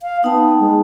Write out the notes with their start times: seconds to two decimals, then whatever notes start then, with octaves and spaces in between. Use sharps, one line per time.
0.01 F5
0.24 B3 D#4 G5 A5
0.59 G#3